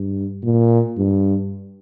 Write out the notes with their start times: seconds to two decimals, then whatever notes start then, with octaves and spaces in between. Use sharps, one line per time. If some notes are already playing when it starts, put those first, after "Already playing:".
Already playing: G2
0.43 A#2
0.98 G2